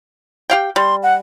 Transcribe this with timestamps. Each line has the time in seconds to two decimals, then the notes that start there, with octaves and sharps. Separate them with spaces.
0.50 G4 F5 G5
0.76 G3 C6
1.03 F#5